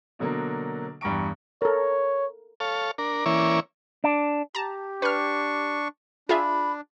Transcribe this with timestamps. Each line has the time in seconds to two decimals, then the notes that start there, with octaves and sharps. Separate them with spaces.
0.19 B2 D3 F#3 A#3 D4
1.01 E2 G2 G3 A#5 C#6 D7
1.62 A4 A#4 C#5
2.60 A4 C#5 F5
2.98 D4 A#4
3.26 E3 A#3 C#4 E4 C#5 D5
4.04 D4
4.55 G4 A5 A#5
5.02 D4 B4 C#6 F6
6.29 D4 F4 G#4 E5 B5